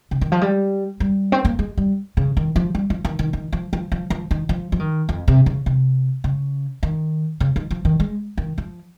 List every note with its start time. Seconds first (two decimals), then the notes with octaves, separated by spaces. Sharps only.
0.11 C#3
0.21 D#3
0.32 F3
0.41 G3
1.00 G3
1.32 C4
1.45 A#3
1.59 G#3
1.77 G3
2.17 C#3
2.37 D#3
2.56 F3
2.75 G3
2.90 F3
3.05 D#3
3.19 D#3
3.33 D#3
3.53 F3
3.73 F3
3.92 F3
4.10 F3
4.31 D#3
4.49 F3
4.72 F3
4.80 D#3
5.09 F2
5.28 C3
5.46 C#3
5.66 C3
6.24 C#3
6.83 D#3
7.40 C#3
7.56 D#3
7.71 F3
7.85 D#3
8.00 G#3
8.38 D#3
8.58 F3